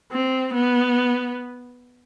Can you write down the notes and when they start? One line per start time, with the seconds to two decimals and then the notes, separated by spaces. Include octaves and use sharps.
0.12 C4
0.54 B3